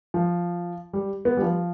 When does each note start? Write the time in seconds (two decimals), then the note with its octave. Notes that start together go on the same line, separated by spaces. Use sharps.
0.14 F3
0.93 G3
1.25 B3
1.37 G3
1.42 F3